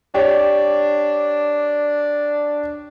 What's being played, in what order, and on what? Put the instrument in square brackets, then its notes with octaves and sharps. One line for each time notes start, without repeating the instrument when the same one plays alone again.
[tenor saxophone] D4 [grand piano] G4 C#5 D5